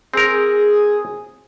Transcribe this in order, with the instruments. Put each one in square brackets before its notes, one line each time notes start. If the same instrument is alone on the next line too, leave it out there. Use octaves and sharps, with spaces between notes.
[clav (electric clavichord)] C4 A#4 [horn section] G#4